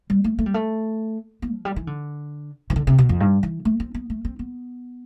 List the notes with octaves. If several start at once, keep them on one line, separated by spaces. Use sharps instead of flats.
G3
A3
A3
G3
A3
B3
F3
G3
E3
D3
E3
D3
C3
B2
F2
G2
E3
A3
C4
B3
A3
C4
B3